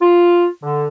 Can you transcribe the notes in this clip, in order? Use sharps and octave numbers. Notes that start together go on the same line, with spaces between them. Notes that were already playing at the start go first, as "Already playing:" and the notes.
F4
D3